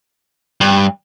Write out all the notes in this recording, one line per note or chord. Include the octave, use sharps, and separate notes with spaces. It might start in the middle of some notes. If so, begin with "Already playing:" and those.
G2